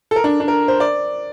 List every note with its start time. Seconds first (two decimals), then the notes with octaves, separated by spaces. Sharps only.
0.11 A4
0.16 A#4
0.24 D4
0.40 D4
0.48 A#4
0.68 C5
0.80 D5